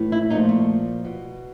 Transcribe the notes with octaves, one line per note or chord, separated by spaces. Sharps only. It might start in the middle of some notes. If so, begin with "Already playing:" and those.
Already playing: A2 E3 A3
E4
A#2 F3 A3 D#4
A3
B2